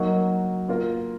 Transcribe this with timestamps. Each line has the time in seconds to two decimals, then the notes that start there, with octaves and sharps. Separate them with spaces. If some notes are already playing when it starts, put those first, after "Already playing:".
Already playing: F#3 A#3 D#4 F#4
0.68 A#3 F4 A#4